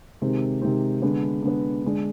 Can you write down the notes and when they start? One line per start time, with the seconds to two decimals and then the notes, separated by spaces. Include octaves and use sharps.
0.22 C3 D#3 G#3 C4
0.62 C3 D#3 G#3 C4
1.02 D3 G#3 B3
1.43 D3 G#3 B3
1.84 D3 G#3 D4